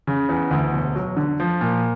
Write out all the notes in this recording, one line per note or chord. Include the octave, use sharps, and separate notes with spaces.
C#3
E2
D2
E1
F#3
D3
F3
A#2